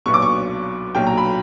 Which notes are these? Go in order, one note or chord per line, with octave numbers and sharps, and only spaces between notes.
B1 A#2 F#3 B3 C#6
D6
C#6
B1 A#2 F#3 G5
A#5
B5